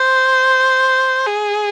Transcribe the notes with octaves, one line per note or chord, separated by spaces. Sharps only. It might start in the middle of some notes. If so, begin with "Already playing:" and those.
Already playing: C5
G#4